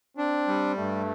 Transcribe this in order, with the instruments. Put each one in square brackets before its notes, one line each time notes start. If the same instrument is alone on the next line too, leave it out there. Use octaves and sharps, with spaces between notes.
[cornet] C4 [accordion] D4
[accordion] G3
[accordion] G2 [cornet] A3